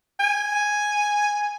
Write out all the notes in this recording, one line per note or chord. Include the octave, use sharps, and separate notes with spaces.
G#5